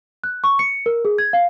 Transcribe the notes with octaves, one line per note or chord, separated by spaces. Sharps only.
F#6
C#6
C#7
A#4
G#4
G#6
F5